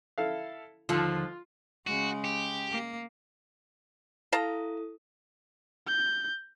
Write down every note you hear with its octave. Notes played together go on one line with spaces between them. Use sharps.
E4 A4 F5
D#2 D3 F3 F4
C#3 G#3 F#4
G4
A#3
E4 A4 F5 A5 A#5 D#6
G6